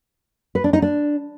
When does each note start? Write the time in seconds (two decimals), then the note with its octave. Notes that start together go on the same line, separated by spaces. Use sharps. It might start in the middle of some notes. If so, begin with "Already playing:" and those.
0.55 B4
0.64 D4
0.73 D#4
0.82 D4